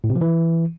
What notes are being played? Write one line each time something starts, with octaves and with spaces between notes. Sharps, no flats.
A2
C3
F3
E3